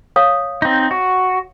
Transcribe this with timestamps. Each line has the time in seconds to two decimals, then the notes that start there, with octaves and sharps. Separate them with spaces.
0.16 C#5 F5 D#6
0.62 C4 D#4
0.91 F#4